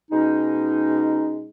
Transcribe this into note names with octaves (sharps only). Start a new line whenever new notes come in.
B2 G#3 C#4 D#4